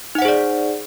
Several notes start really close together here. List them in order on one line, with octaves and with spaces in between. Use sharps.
D#4 F#5 C5 G#4 D5